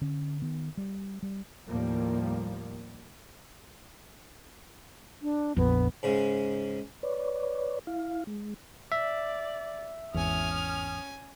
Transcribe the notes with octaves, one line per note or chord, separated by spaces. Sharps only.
D3 C#4
D#3 B3
G3
G3
D#2 A2 F3 G3 A#3
D4
A#1 F2 B3
G#2 C#3 G#3
B4 C#5 D5
E4 F5
G#3
D5 E5
G#1 E2 C#4 G#5 D#6 F6